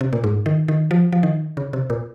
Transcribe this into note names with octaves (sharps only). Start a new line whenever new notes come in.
C3
A#2
G#2
D#3
D#3
F3
F3
D#3
C#3
C3
A#2